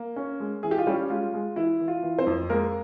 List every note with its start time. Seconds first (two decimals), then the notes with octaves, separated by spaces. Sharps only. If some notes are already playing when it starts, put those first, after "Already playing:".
Already playing: A#3
0.16 C#4
0.40 G#3
0.63 E3 G#4
0.71 G4
0.78 F4
0.87 G3 C#4 G4
1.10 G#3 F4
1.34 G#3
1.56 E3 E4
1.80 E3
1.88 F4
2.03 E3
2.18 C4 C5
2.27 F2
2.50 G#3 A#3 A#4